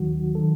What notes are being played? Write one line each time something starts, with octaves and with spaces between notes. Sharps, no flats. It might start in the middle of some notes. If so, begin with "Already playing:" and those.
Already playing: D#2 D#3 F#3 F#4
D#3 F#3 A4